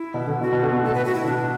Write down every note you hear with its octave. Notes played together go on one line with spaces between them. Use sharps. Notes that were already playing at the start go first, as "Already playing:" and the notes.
Already playing: E4
B2
D3
B2 F#4
B2
D3
B2
A2 A4
B4
F#4
E4
B2 D4